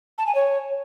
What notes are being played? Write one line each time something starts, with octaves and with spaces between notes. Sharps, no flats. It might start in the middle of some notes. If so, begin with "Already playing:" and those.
A5
G#5
C#5